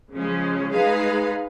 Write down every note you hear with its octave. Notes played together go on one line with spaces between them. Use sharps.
C#3 F3 G#3 C#4
G#3 D#4 G#4 B4 F5